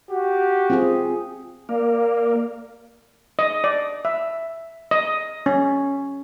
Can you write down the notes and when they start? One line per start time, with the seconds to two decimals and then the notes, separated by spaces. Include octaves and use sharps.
0.10 F#4 G4
0.70 C4 F4 G#4
1.69 A#3 A#4 D5 F5
3.39 D#5
3.64 D5
4.05 E5
4.91 D#5
5.46 C#4